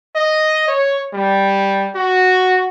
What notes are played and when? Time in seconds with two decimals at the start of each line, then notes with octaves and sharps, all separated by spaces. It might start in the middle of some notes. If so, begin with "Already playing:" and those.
0.15 D#5
0.68 C#5
1.13 G3
1.95 F#4